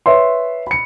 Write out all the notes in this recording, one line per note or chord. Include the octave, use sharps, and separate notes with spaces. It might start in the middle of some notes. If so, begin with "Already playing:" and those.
B4 C#5 E5 C6
B5 C#7